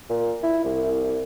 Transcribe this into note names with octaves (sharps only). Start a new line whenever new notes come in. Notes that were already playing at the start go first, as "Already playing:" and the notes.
A#2
E4
C2